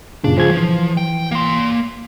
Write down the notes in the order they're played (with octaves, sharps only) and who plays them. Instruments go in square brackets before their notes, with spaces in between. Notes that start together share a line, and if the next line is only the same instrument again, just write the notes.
[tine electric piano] F#2 A#2 C#3 [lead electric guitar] D4
[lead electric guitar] C#2 [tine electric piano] F3 G#4 G#6
[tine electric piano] E3 [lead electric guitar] F3
[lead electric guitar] G5
A#3 C6